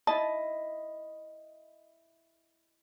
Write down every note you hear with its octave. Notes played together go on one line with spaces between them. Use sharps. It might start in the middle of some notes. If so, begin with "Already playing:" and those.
E4 D#5 A5